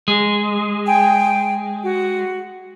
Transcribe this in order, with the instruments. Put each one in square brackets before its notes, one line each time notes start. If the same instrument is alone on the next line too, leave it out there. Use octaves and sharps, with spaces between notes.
[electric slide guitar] G#3
[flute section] G5 G#5
F#4